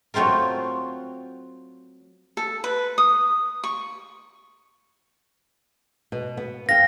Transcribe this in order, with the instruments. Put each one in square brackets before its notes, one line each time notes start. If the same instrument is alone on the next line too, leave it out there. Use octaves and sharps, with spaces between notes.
[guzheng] F#3 A3 C4 F4 A#4
[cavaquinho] A4
B4
D#6
C#6
[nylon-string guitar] B2
B3
[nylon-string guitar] F5 G5 [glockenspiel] A#6